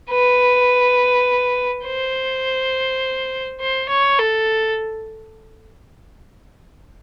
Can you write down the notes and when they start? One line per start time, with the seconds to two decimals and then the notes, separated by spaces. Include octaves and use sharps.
0.10 B4
1.85 C5
3.61 C5
3.89 C#5
4.19 A4